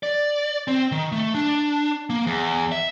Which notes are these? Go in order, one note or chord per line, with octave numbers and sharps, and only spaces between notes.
D5
C4
D#3
A3
D4
A#3
E2
E5